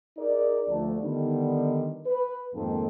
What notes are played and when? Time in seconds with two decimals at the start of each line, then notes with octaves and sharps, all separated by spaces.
0.17 D#4 G#4 A#4 D5
0.67 D2 F3 A3 D4
1.00 D3 D#3 G3 B3 D#4
2.06 B4
2.53 F2 G#2 D#3 A#3 C4 A4